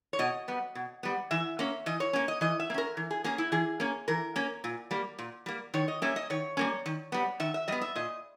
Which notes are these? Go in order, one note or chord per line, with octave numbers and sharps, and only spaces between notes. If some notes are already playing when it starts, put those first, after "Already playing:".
C#5
B2 D#5
G3 B3
B2
G3 B3
E3 E5
A#3 C#4
E3 D#5
C#5
A#3 C#4
D#5
E3 D#5
E5
A#3
C#4 A#4
E3
G#4
A#3 C#4 G#4
E4
E3 G#4
A#3 C#4
E3 A#4
A#3 C#4
A#2
G3 A#3
A#2
G3 A#3
D#3 C#5
D#5
G3 A#3 C#4 E5
D#5
D#3 C#5
G3 A#3 C#4
D#3
G3 B3
D#3 E5
E5
G3 B3 D#5
E5
A#2 D#5